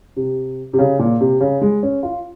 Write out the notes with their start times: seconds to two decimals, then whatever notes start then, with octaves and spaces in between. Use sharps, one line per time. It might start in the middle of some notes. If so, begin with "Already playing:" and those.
0.16 C3
0.73 C3
0.79 C#3
0.99 A#2
1.21 C3
1.40 C#3
1.62 G#3
1.83 C#4
2.03 F4